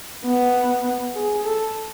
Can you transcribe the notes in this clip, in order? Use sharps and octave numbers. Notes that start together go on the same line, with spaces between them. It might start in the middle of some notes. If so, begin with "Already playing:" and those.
B3
G#4
A4